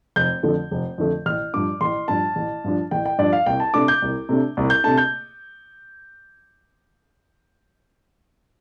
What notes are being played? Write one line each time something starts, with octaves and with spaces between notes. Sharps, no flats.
F1 G6
F2 D3 A3
F1
F2 D3 A3
A1 F6
G2 F3 D4 D6
A1 C6
G2 F3 D4 A5
A1
G2 F3 D4
A1 G5
G5
G2 F3 D4 D5
F5
C2 G5
A5
C3 A3 D4 D6
G6
C2
C3 A3 D4
C2
G6
C3 A3 D4 A5
G6